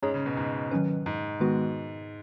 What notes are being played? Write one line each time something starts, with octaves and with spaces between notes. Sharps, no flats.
G#2 C#4 G#4 C#5
C#3
B2
G#2
D#3 F#3 C#4 B4
G#2
D#3 G#3 B3 F#4 B4